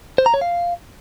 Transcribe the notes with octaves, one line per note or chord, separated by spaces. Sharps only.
C5
A#5
C#5
F5